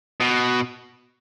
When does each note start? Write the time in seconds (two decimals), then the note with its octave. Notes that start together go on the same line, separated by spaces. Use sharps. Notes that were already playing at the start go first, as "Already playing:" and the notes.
0.20 B2